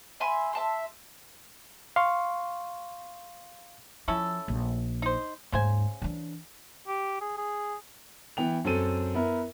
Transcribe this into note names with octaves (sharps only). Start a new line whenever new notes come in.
E5 G#5 B5 C6
E5 A5 C6
F5 C6 C#6
F3 C#4 E4 A4
A#1
D#4 C5
D#2 G#2 C#3 C5 G#5
E3 D4
G4
G#4
G#4
E3 B3 G5 F7
F#2 C4 A4 D#7
B3 E4 A#4